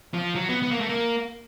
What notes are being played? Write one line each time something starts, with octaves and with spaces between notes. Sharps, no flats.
F3
F#3
B3
B3
A#3
A3
A#3